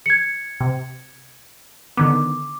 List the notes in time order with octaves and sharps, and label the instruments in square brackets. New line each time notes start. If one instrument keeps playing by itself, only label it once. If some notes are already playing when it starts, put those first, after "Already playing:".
[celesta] G#6 C#7
[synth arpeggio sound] C3
[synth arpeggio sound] D3 D#3 B3 [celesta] D6